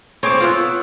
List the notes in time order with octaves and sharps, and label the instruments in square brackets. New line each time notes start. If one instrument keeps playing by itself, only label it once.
[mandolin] C4 G#4 D6 [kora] C5 C#5
[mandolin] B3 E6 F#6 [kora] F4